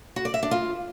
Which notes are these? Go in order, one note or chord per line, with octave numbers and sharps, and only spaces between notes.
F#4
D5
E5
D4
F4